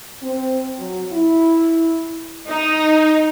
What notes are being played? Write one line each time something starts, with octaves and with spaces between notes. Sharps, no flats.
C4
F#3
E4
D#4